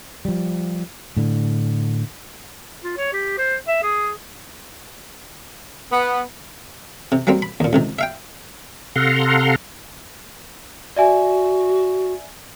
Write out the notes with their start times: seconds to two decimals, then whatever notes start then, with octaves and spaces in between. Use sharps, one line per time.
0.25 F3 G3
1.17 A2 D3
2.84 F4
2.97 C#5
3.13 G4
3.38 C5
3.67 E5
3.83 G#4
5.92 B3
7.12 C3
7.27 F#3 G3 A#3 C4
7.42 B5
7.60 D#2 A#2
7.73 C#2 C3 D#3
7.99 E5 F5 G5
8.96 C3 A4 F5 F#5 A#5 C6
10.96 F#4 D5 E5 G#5